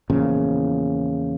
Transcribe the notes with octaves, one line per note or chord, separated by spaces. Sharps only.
E2 A#2 C#3 F3